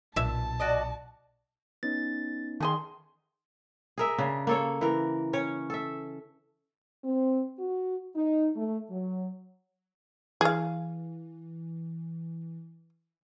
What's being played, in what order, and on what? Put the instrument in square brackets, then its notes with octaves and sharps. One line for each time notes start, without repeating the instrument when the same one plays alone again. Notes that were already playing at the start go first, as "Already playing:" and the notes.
[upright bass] B1 [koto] A#2 E5 [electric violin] A5
[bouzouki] F#4 D5 D#5
[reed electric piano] B3 C#4 D#4 [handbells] A6
[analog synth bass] D#3 [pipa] A3 G#4 C6
[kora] G#4 A#4 E5
C#3 D4
A#3 A4 C#5
E3 A#4
C#4 C#5
A4 E5
[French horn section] C4
F#4
D#4
A3
F#3
[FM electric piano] E3 [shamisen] G#4 F5